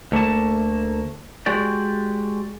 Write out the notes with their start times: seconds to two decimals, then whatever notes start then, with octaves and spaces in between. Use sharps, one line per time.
0.12 D2 A3 A#3 A5
1.46 G#3 F#4 G4 D5